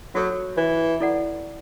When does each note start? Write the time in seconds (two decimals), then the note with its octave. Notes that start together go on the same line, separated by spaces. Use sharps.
0.15 F#3 F#4 A4 C#5
0.57 E3
1.00 E4 A4 D5 F#5